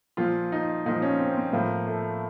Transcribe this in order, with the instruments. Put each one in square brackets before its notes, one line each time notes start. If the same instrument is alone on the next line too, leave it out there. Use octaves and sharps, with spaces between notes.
[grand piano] A#2 F3 F4
D#4
A#2 F3 D#4
C#4
C4
C4
A2 F3 A#3
A3